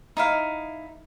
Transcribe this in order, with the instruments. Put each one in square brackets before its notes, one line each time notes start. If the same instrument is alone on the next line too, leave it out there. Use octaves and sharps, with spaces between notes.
[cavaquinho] D#4 E4 F5